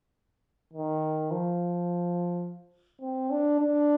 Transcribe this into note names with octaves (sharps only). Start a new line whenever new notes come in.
D#3
F3
C4
D4
D4